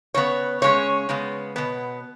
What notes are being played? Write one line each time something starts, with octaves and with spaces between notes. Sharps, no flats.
C#3 B3 C#5
C#3 G#3 C#4 C#5
C#3 G#3 B3
B2 B3